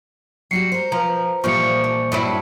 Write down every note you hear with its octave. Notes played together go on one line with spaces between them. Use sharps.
F#3 G3 F#4 C7 C#7
A#4 C5
F3 B4 A#5
A#2 E3 F3 G3 C#6 C#7
D4
G2 F#3 E4